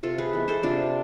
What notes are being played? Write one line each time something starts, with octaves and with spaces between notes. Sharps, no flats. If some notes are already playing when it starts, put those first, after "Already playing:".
C3 F4 A4
G#4 B4
E3 G#3 B3
A4 C5
C3 D4 F4